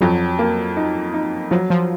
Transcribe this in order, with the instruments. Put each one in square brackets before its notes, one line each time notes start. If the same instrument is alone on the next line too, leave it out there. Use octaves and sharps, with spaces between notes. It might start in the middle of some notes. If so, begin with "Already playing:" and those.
[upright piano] F2 [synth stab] F#3
[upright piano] A#3
D#4
D#4
[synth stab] F3 [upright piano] F#3
[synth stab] F3